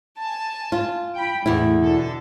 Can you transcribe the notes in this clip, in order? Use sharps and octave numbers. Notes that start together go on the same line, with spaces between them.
G#5 A5
F4
G5 B5
E2 A2 D3 E4
B2 D3 A4